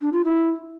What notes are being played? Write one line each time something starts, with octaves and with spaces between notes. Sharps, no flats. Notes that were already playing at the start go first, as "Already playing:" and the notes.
D4
F4
E4